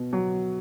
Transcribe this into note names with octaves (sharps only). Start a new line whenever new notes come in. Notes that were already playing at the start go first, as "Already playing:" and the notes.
Already playing: B2
F#3